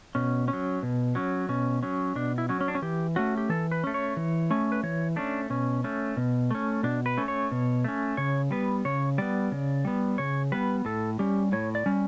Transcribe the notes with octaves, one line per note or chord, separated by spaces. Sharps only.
B2 C#4
C#4
F#3
B2
F#3 C#4
B2 C#4
F#3 C#4
B2 D4
E4
F#3 C#4
C#4
D4
C#4
E3 G4
A3 C#4 F#4
G4
E3 A4
B4
A3 C#4
C#5
E3
A3 C#4
B4
E3 C#5
A3 C#4 D4
B2 C#4
A3 C#4
B2
A3 C#4
B2 D4
B4
A3 C#4
C#5
B2
A3 C#4
C#3 C#5
G3 B3 B4
C#3 C#5
G3 B3 D5
C#3
G3 B3
C#3 C#5
G3 B3 B4
A2 A4
G3 C#4 G4
A2 C#5
D5
G3 C#4